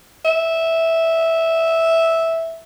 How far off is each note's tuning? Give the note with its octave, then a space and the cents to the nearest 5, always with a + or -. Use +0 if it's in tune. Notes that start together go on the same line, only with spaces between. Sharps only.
E5 -10